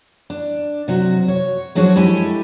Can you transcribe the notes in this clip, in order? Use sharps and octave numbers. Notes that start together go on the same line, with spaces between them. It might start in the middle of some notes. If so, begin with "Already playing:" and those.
D4
C3 F#3 F#4
C#5
F3 F#3 D4 F#4 G#4 C#5
G#3 E4 G4 A4 G#5